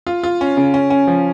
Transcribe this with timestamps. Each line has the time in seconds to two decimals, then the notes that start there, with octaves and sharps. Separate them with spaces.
0.07 F4
0.23 F4
0.41 C#4
0.57 C#3
0.74 C#4
0.90 C#4
1.07 F3